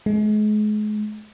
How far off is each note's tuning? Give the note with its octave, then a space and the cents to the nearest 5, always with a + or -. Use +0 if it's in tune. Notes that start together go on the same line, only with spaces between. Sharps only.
G#3 +35